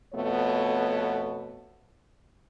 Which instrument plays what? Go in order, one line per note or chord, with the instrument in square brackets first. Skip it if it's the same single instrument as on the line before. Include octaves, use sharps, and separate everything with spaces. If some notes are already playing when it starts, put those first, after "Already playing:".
[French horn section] F2 B2 A3 B3 C#5